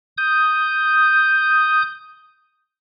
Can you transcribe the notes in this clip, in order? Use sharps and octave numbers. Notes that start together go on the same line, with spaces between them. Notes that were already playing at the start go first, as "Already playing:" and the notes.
D#6 G6